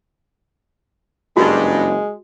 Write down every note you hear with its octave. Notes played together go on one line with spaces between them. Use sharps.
F#1 G2 G#3 F#4